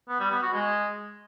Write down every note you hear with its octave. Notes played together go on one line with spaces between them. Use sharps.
B3
G3
B3
F#4
G#3